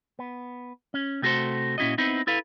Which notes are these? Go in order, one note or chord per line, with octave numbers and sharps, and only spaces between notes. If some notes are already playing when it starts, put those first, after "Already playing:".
B3
C#4
C3 A3 F#4 G#4 A4 C5
A#2 C#4 E4 F#4 D#5
B3 C4 D#4 E4
E4 A4 B4 F5